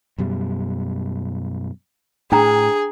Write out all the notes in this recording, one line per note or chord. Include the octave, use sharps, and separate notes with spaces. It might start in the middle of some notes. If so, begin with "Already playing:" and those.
F#2 B2 G3
A2 D4 G#4 G5 A#5